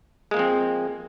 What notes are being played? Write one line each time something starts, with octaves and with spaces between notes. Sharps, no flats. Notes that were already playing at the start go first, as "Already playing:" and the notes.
F3 G#3 A#3 C4